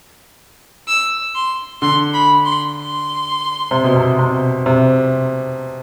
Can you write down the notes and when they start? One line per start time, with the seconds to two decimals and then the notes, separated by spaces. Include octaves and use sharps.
0.88 E6
1.35 C6
1.82 D3 C6
2.14 B5
2.46 C6
2.77 C6
3.71 C3
3.84 B2
3.96 C3
4.19 C3
4.66 C3